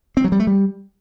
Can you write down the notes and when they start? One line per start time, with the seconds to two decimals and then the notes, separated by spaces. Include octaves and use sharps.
0.17 C4
0.24 F#3
0.32 G3
0.40 A3
0.47 G3